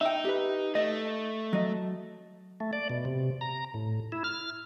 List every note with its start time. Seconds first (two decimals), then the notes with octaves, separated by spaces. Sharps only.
0.01 D#4 E5 G5
0.25 G4 B4
0.75 A3 D#5
1.53 F#3 D#5
2.60 A3
2.73 D5
2.90 B2
3.05 C3
3.41 A#5
3.74 A2
4.12 E4
4.24 F6